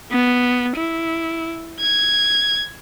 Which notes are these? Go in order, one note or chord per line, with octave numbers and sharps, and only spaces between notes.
B3
E4
G#6